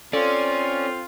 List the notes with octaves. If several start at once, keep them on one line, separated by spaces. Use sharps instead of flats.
C4 C#4 F4 A4 D5